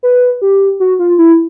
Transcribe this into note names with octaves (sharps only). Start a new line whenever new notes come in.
B4
G4
F#4
F4
E4